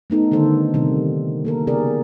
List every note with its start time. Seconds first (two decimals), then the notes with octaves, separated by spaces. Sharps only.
0.10 A3 B3 D#4 A4
0.32 D3 D#3 G3 A4 C5
0.74 C3 D#3 G3
1.45 A#3 A4 A#4
1.67 C#3 B3 G4 G#4 A#4 D5